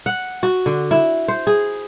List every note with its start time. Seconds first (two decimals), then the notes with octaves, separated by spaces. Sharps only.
0.06 F#5
0.43 F#4
0.66 D3
0.91 E4
1.28 C5
1.47 G#4